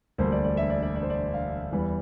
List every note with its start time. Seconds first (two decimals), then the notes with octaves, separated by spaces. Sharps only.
0.18 E1 D2 D3 G3 A#3 C5
0.32 D5
0.45 D5
0.57 E5
0.70 D5
0.83 D5
0.96 D5
1.03 C5
1.10 D5
1.34 F5
1.72 E2 E3 G3